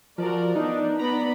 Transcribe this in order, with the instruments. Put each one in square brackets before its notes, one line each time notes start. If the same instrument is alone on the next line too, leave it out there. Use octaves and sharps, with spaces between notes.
[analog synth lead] F3 [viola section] F#4 A#4 D5
[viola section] B3 D4 [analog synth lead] D#4
[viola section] B3 D5 B5 [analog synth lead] A#5